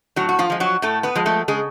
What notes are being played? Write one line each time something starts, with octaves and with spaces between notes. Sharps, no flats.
A2 F#3 F#4
F#4
F3 F4
F3 G#3
F#3 F#4
A2 A3 A4
B3 B4
F3 G#3
A3 A4
C#3 G#3 G#4